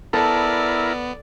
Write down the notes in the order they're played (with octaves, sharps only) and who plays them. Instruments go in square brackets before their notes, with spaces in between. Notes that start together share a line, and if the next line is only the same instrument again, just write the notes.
[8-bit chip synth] B3 [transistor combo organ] E4 A#4 [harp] A4 [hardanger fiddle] D5